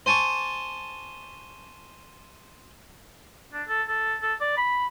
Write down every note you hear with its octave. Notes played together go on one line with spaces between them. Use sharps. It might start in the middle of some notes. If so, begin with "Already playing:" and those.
C5 G#5 A5 C#6 D6
D4
A4
A4
A4
D5
B5